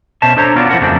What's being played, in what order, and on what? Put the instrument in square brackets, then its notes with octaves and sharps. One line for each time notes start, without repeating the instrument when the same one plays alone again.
[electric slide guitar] B2 C#4 C5 E5 A5
D4 A4 C5 C#5 A#5
B3 C#4 F4 F#4 D5
F3 E4 F#4 A#4 F#5
F2 C#3 F#3 A3 C4 D4